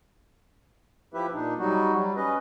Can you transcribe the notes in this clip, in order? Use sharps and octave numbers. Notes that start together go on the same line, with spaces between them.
F3 E4 G4 B4 E5
A#2 D4 D#4
F#3 G3 D#4 F#4
F#3 G3
C#4 B4 D#5